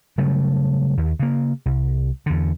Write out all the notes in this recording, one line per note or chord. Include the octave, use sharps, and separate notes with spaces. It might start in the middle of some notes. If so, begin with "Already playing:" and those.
C#3 F#3 G3 A3
D#2
C#3 A#3
C2
E2 D3